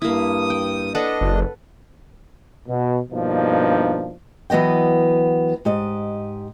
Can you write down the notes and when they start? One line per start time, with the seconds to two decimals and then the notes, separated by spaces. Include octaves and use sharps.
0.02 G2 A#3 E4 D#6
0.50 G5
0.95 D4 A4 B4 D#5 F#5
1.21 F#1
2.68 B2
3.12 G2 B2 F3 A#3 D4 D#4
4.50 E3 F#3 B3 D#5 G5
5.65 G#2 G4 D#5